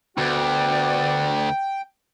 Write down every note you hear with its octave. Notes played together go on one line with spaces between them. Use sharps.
D2 B3 F#4 D5 G5